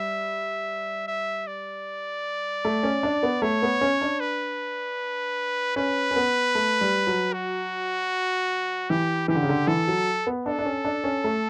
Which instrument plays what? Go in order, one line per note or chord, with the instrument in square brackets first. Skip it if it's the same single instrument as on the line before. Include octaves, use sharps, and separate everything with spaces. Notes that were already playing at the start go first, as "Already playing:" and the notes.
Already playing: [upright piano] G3 [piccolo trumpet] E5
[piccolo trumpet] E5
D5
[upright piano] A3
C#4
D4
B3
[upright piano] A3 [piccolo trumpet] C#5
[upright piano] B3
C#4
D4
[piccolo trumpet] B4
[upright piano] C#4 [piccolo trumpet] B4
[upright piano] C#4
B3
A3
G3
F#3
[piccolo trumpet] F#4
[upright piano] E3 [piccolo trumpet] G4
[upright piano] E3 [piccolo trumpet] G4
[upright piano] D3
C#3
D3
[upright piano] E3 [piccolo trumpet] A4
[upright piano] F#3
B3
[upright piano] D4 [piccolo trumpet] A4
[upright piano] D4
C#4
D4
C#4
A3